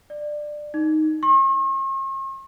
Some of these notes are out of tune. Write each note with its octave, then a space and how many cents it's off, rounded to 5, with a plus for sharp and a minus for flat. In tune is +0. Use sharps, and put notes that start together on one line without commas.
D5 +15
D#4 +0
C#6 -45